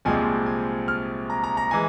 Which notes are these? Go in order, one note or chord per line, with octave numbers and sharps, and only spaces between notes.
C2 A#2 F3 G#3 C4 G#5
G#5
F6
A#5
A#5
A#5
E3 G#3 G#5